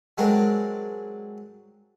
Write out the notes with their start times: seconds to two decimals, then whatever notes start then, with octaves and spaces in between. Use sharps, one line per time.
0.18 F#3 G#3 C4 D4 A#4